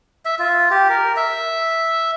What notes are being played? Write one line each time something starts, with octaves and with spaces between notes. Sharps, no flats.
E5
F4
G4
A#4
E5